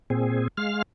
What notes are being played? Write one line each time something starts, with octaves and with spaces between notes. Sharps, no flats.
A#2 C4 G#4
G#3 F5 F6